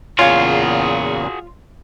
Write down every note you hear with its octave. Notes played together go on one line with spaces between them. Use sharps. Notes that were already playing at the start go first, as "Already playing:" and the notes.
E2 A#2 C#3 F4 F#4 G#4 C#5 F5